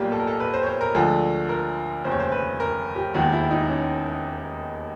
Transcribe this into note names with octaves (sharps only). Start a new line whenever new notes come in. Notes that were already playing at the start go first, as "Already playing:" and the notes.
Already playing: B1 A#2 G3 A#3 G4
A4
A#4
A4
B4
C5
C#5
C5
A#4
D2 D3 F3 G#3 A4
A#4
F1 D#2 C#3 C5
C#5
C5
B4
A#4
G4
E1 D#2 D#3 G#3 F#4
E4
D#4
C#4